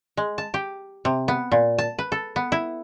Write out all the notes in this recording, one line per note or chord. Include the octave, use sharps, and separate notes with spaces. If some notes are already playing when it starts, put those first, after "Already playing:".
G#3
A5
G4
C3
B3
A#2
A5
B4
A4
B3
E4